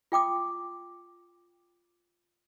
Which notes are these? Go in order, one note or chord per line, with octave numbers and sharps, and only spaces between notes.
F4 G5 D6 D#6